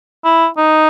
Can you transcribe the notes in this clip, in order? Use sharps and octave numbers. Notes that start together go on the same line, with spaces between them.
E4
D#4